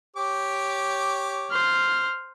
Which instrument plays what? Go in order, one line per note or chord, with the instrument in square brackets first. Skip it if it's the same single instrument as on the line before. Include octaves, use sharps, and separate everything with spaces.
[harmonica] G4 C#5 D6
[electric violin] C5 F6